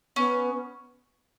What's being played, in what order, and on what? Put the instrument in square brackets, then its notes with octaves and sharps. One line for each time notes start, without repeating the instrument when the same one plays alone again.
[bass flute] B3 [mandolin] C#4